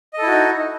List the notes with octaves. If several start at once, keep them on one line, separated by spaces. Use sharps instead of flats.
D#4 E4 F#4 A4 D#5